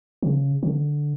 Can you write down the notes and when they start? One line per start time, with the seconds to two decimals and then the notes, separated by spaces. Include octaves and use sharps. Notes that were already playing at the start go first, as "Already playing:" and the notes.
0.23 D3
0.26 C#3
0.63 D3